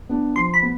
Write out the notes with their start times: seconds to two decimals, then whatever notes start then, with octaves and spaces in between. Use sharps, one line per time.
0.09 B3 D4
0.36 F3 C6
0.54 B5
0.62 B3